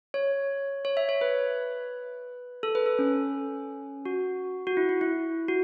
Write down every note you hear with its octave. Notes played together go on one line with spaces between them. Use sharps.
C#5
C#5
E5
C#5
B4
A4
B4
A4
C#4
F#4
F#4
E4
E4
E4
F#4